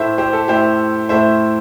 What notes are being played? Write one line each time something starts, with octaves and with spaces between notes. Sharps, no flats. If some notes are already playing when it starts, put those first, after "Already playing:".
Already playing: A2 A3 E4 C5 E5
G4 C5
A4
A2 A3 E4 G4 C5
A2 A3 E4 C5 E5